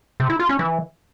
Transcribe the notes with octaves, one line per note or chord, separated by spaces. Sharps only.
C3
E4
F4
C#4
E3